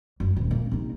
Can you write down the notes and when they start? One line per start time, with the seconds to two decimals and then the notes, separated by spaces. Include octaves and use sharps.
0.20 F#1
0.36 D#1
0.51 A#3
0.71 C3 D#4